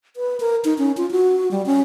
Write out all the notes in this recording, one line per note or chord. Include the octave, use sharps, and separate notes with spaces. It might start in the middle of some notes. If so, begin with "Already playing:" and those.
B4
A#4
D#4
C#4
F4
F#4
G3
C#4